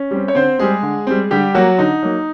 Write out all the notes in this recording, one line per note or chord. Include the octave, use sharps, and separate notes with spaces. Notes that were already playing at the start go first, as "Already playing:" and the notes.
Already playing: C#4
G3 C4
C#5
D3 C4 C5
G3 G#3 C4 G#4
D3
G3 C4
D3 G3 G4
F#3 A#3 F#4
D3 D#4
F#3 A#3